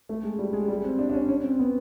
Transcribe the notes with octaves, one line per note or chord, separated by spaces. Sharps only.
A3
G#3
G3
G#3
G3
C4
D4
D4
C#4
C#4
C4
B3